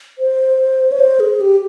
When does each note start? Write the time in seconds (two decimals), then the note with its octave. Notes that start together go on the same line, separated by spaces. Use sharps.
0.18 C5
0.92 C#5
1.00 C5
1.20 G#4
1.40 G4